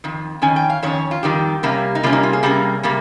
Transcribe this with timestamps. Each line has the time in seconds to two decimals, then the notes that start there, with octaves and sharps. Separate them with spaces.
0.04 F2 D#3
0.42 F2 D#3 C#4 G#5
0.56 G5
0.70 F5
0.83 F2 D#3 C#4 C#5
1.11 F4
1.23 F2 D#3 G3 G4
1.63 C3 G3 A#3 C#4
1.95 D#4
2.03 C3 G3 A#3 C#4 F4
2.13 D#4
2.23 F4
2.33 G#4
2.43 C3 G3 A#3 C#4
2.83 C3 G3 A#3